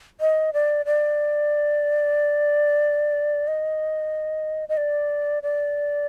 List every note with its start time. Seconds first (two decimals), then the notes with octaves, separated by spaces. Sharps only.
0.21 D#5
0.53 D5
0.86 D5
3.48 D#5
4.69 D#5
4.77 D5
5.43 D5